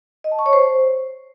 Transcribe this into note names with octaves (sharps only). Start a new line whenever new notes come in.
D#5
A5
C#6
C#5
C5